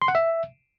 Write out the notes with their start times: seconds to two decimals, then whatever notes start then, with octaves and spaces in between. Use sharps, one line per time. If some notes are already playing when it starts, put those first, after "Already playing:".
0.02 C6
0.08 F#5
0.15 E5